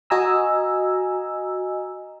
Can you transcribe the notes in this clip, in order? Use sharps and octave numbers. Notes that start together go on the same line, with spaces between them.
F#4 D#5 G#5 A#5 E6